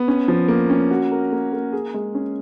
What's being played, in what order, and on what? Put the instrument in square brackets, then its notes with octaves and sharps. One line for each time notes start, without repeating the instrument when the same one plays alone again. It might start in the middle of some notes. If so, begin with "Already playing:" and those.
Already playing: [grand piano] B3
C#4
F3
A#3
C#4
F#4
A#4
A#3
A#3
G#4
G#3
C#4